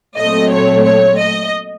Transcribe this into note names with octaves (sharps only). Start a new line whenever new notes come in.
A#2 F#3 A3 C4 D#5
C#5
C#5
D#5